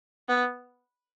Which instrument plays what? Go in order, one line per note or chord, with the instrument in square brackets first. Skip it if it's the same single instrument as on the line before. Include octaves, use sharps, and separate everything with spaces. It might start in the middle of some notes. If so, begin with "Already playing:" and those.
[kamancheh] B3